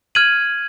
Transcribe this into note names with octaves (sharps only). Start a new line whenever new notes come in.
F6 G#6 D#7 F#7